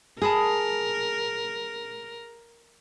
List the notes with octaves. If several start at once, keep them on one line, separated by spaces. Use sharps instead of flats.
G#4 A#4 A5 B5 D#6